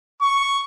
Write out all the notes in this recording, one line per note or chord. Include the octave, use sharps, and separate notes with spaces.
C#6